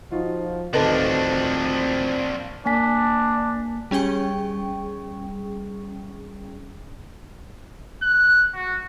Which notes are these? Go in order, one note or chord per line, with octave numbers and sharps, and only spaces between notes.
F3 D#4 F4 F#4
D1 D#3 F3 C4 D4 A4 B4 D#5
A#3 D4 G#5 B6
G3 C#4 G#4 G5 C#6
F#6
F#4